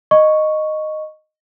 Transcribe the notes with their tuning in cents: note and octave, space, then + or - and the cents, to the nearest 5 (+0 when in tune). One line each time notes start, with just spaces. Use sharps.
D#5 -10 C#6 +0